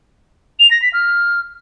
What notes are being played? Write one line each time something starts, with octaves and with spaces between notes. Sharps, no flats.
F7
A#6
B6
F6